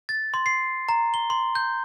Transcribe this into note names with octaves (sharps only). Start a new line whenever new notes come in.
A6
C6
C7
A#5
G7
C6
G6